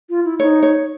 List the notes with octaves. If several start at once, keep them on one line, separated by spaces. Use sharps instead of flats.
F4
E4
D#4 C#5
C#5